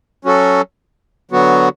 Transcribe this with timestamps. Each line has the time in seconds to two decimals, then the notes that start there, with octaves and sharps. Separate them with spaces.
0.25 F#3 C#4 F#4 A4
1.31 D3 F#3 B3 F#4